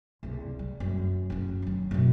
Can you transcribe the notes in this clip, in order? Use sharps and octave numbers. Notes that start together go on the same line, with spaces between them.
C2 C#3
G3
F#2
F#2 C#4
D#3 F#3
F#2 B2